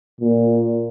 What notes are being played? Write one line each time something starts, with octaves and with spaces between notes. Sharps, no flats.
A#2